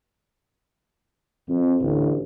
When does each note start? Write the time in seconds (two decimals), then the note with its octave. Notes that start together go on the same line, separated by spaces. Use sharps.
1.49 F2
1.80 A1 D2